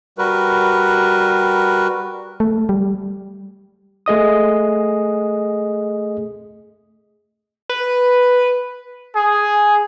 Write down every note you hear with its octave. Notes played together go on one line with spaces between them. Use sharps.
G3 F#4 A#4 B4
A3
G3
A3 G#4 D#5 D#6
B4
G#4